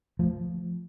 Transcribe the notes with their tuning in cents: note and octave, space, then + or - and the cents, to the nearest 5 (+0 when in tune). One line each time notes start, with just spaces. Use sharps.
F3 +0 A3 +0